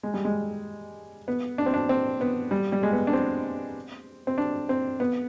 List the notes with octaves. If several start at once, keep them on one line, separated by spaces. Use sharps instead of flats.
G#3
G3
G#3
B3
D4
C4
D4
C4
B3
G3
G3
G#3
B3
D4
C4
C4
D4
C4
B3